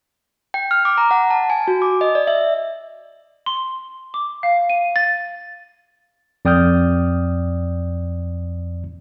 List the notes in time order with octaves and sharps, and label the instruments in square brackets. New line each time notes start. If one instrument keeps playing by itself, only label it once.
[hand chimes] G5
F6
D6
A#5
F#5
A5
G#5
F#4
D6
D#5
D5
E5
[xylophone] C6
D6
F5
D#7
A6
[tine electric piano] F2 D5 G5 D#6 F6 G6